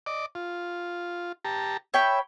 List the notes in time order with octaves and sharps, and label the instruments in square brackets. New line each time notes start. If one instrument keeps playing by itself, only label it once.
[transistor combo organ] D5 D#5 D6
F4
G4 A5 A#5
[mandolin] C#5 G5 B5 [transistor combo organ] E5